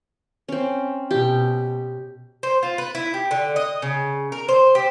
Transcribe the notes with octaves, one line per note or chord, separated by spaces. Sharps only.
C4 C#4
B2 G4
C5
F4
B4
E4
G4
D3
D#5
C#3
A#4
C5
G4